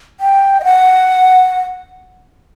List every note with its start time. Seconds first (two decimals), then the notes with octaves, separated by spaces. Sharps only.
0.20 G5
0.60 D#5
0.64 F#5